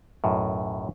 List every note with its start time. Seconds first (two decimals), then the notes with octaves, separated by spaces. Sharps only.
0.24 B1 F#2 A2